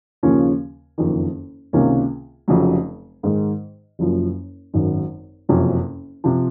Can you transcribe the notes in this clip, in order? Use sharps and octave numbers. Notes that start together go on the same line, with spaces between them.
D#2 C#3 F3 A#3 C#4
F#1 F2 D#3
C#2 C3 D#3 A#3 C#4
F1 F2 C#3 F#3
G#2 D#3 G#3
F#1 F#2 F3
G#1 F#2 D#3
F#1 F2 C3 F#3 C#4
C3 F3